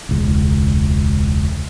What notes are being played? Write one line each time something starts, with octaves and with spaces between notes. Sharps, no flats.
E1 C#2